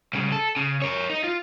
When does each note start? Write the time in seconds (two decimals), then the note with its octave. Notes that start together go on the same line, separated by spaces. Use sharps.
0.13 C2 C#3
0.32 A4
0.57 C#3
0.82 A#4 C#5
1.10 D#4
1.24 F4